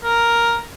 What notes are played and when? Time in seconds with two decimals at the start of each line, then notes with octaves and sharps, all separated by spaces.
0.04 A#4